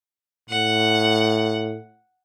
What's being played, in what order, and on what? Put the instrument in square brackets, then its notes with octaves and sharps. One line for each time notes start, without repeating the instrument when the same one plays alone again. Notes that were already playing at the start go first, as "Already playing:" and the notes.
[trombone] A2 [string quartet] F#5